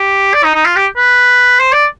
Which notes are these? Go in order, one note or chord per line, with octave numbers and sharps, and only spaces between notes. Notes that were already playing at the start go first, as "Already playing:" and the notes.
Already playing: G4
D5
D#4
D#4
F4
G4
B4
C5
D5